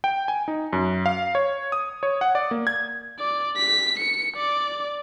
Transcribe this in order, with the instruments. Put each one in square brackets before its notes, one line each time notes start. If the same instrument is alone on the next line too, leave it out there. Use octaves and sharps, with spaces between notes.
[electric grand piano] G5
G#5
D#4
F#2
F5
C#5
D#6
C#5
F#5
D5
A#3
G#6
[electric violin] D5
B6
C#7
D5